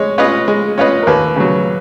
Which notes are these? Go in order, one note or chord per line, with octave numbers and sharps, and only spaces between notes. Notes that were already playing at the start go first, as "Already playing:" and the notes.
Already playing: G#3 C#5
C#4 F4 B4 D#5
G#3
C#4 F4 B4 D#5
A#4
D#2 B4
C#3 F#3